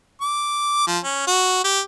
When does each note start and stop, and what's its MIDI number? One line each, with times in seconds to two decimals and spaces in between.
0.21 0.84 86
0.87 0.98 53
1.04 1.23 61
1.27 1.63 66
1.64 1.80 67